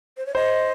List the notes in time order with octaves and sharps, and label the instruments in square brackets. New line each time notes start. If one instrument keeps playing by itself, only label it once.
[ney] C5
C#5
[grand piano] C5 [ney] D#5